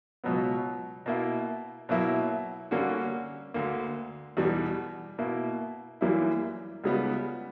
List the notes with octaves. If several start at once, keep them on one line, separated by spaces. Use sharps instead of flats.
C#2 B2 F#3 B3
B2 A#3 E4
B2 F#3 A#3 E4
D3 G3 A#3 C#4 F#4
D2 D3 A#3
E2 B2 G3
B2 A#3 E4
F#2 E3 G3 A#3 E4
C#2 C#3 G3 B3